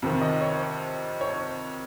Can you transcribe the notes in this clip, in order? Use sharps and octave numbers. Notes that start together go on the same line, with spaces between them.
F2 C3 D#3
D#5
C#5
C#5